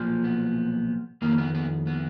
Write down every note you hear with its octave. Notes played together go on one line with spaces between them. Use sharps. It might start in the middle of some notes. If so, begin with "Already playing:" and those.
Already playing: B1 A#2 F3
B3
F2 D#3 A#3
B3
B3
B3